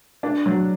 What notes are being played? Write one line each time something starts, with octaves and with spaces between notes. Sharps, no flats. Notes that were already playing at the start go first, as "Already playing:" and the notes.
D4
F#3